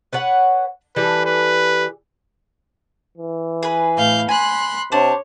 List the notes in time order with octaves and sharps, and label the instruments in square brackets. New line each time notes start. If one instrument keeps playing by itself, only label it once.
[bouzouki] B4 C#5 F#5
[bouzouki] E3 G3 A4 [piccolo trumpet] B4
[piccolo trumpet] B4
[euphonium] E3
[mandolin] G#4 B4
[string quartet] A2 F5 G6
[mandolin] G#5 [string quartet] B5 C6 F#6
[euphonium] C3 [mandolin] D4 C5 [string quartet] C#5